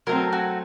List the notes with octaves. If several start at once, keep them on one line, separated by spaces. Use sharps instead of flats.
F#3 A3 C4 A#4
F#4